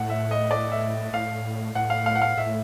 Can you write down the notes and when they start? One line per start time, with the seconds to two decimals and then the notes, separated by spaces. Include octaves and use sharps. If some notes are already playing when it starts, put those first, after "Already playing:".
Already playing: A2 F#5
0.10 E5
0.31 D#5
0.51 D5
0.72 E5
1.13 A2 F5
1.75 A2 F#5
1.90 F5
2.06 F5
2.16 F#5
2.22 F5
2.37 A2 E5